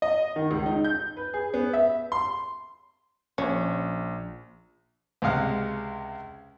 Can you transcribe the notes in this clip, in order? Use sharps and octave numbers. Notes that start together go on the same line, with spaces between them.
D#5
D#3
C#2
D#4
G6
B4
G#4
B3
E5
C6
A#1 C#4
C#2 C3 G#3 F5 F#5